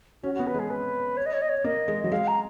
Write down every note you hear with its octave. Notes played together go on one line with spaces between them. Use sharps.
C#4 F#4
B3 F#4
B4
G#3 G#4
B4
C#5
D#5
C#5
D#5
C#5
A#3 D#5
G#3
F#3 D#5
G#3 F5
A#5